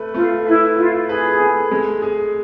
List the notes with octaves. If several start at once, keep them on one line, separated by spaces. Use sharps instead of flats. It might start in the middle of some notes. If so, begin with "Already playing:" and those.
Already playing: A3 B4
A3 F4
E4 B4
E4 F4
G#4 B4
A3
G#3
G#4